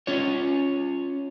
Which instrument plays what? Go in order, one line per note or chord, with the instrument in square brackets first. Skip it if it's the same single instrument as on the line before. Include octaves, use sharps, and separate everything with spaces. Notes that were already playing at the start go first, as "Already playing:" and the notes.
[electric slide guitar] C#4 F4 C#5